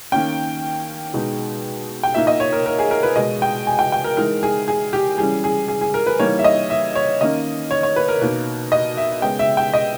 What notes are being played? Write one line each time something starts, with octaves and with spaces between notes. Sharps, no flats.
D#3 A#3 C#4 G5
B2 G#3 D#4
G5
A#2 A#3 D#4 E5
D#5
C#5
A#4
A#4
G#4
A#4
B4
B2 G#3 B3 D#5
G5
G#5
G5
G5
A#4
E3 G#3 D#4 A#4
G#4
G#4
G4
E3 G3 C#4 G#4
G#4
G#4
G#4
A#4
B4
E3 G3 A#3 D#4 C#5
E5
D#5
E5
C#5
D#3 A#3 C#4 D#5
C#5
C#5
B4
A#4
B2 A#3 D#4
D#5
E5
C#3 G#3 B3 G5
E5
G5
D#5